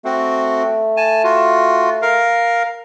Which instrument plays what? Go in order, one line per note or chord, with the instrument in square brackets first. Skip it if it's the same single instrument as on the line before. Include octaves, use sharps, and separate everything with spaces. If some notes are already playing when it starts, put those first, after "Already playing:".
[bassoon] A3 [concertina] C4 F#4
[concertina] G#5 A5
F4 F#4
A#4 F5